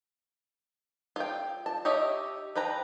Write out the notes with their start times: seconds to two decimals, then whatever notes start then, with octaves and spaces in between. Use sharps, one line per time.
1.16 F4 G5
1.66 A5
1.85 G4 C#5 D#5 E5
2.56 F3 B4 G5 A#5